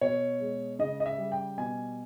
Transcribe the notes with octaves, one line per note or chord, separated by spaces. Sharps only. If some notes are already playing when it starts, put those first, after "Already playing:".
B2 C#5
G#3
C#3 D#5
D#5
E5
G3
G5
B2 G#5